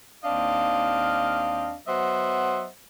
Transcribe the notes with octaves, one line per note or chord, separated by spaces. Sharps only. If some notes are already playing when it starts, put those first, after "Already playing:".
D#2 C4 D4 D#5 F5
F#3 B3 C5 D#5 E5 F#5